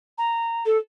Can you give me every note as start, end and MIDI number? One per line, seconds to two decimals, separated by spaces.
0.18 0.64 82
0.66 0.78 69